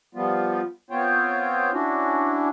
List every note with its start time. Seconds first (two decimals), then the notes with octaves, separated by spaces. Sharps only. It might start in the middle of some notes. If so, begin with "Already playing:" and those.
0.15 F3 G3 B3 F4
0.91 B3 C4 F4 C5 C#5 G5
1.72 C#4 D4 E4 F#4